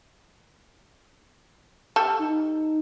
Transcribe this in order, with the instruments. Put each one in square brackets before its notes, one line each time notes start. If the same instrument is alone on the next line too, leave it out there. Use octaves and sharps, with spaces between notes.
[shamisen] G3 A4
[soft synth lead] D#4